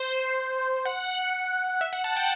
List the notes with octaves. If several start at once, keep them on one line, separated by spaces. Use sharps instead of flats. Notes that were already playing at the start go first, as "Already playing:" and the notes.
Already playing: C5
F#5
E5
F#5
A5
G5